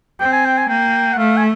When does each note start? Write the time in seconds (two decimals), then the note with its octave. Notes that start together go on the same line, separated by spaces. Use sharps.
0.20 C4 G5
0.33 G#5
0.45 G5
0.58 G#5
0.69 A#3 G5
1.13 F#5
1.18 A3 F5
1.37 G#5